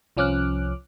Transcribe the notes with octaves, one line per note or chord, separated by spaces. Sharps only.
C2 F3 C#4 D6 F6 F#6